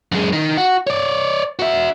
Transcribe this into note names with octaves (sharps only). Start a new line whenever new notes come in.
F#2 G#3
D#3
F#4
C#5 D5
F#4 E5